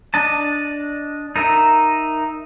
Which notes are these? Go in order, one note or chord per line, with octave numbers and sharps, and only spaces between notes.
D4 D#5 A5
D#4 A#4 E5